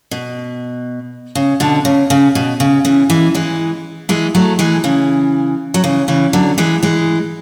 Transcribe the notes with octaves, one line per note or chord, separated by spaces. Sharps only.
B2
C#3
B2 D3
C#3
C#3
B2
C#3
C#3 E3
E3 G#3
E3 G#3
E3 G#3
F#3 A3
E3 G#3
C#3 E3
F#3
C#3 E3
C#3 E3
D3 F#3
E3 G#3
E3 G#3